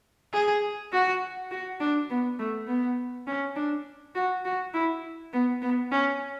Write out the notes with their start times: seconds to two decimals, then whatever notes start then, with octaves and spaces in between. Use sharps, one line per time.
0.33 G#4
0.93 F#4
1.51 F#4
1.80 D4
2.10 B3
2.39 A3
2.68 B3
3.27 C#4
3.56 D4
4.15 F#4
4.45 F#4
4.74 E4
5.33 B3
5.62 B3
5.91 C#4